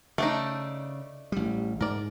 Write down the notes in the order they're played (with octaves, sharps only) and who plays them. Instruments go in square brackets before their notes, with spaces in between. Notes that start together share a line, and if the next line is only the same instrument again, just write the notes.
[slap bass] C#3 [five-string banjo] A3 D4 D#4
[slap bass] A1 G3
[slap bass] G#2 [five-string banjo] A#4 D5